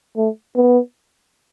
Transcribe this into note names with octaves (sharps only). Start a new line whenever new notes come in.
A3
B3